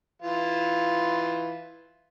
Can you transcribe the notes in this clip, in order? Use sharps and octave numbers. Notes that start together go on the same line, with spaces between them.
E3 F4